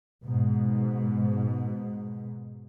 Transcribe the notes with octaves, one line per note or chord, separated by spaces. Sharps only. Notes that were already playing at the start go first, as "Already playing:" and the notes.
G#2 B2